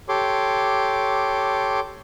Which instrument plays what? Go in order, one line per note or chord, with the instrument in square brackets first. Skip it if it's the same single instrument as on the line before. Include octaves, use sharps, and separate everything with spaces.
[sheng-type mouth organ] G4 A4 C#5 C6 D6